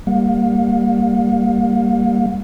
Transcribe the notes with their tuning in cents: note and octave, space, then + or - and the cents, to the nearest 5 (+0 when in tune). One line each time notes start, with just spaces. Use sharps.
G3 +20 A#3 +0 F5 +40